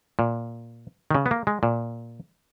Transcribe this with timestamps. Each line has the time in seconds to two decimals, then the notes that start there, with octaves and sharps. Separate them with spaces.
0.19 A#2
1.11 D#3
1.15 C#3
1.26 B3
1.31 A#3
1.47 G#3
1.63 A#2